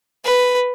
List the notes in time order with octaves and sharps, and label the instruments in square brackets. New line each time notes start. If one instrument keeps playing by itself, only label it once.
[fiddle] B4